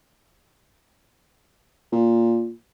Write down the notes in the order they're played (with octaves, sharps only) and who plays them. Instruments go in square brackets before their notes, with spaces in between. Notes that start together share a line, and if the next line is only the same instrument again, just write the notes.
[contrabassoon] A#2